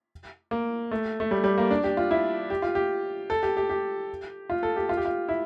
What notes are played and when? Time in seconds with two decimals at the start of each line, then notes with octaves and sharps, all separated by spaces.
0.51 A#3
0.91 A3
1.20 A3
1.31 G3
1.44 G3
1.58 A#3
1.71 D4
1.84 G4
1.97 F4
2.11 E4
2.50 G4
2.62 F4
2.75 G4
3.30 A4
3.43 G4
3.57 G4
3.69 G4
4.50 F4
4.63 A4
4.76 G4
4.89 F4
4.97 G4
5.05 F4
5.28 E4